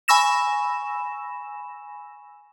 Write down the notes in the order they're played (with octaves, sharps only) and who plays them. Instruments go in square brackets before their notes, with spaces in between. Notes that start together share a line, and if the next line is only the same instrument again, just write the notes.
[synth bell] G#5 B5 C#6 E6 A#6 E7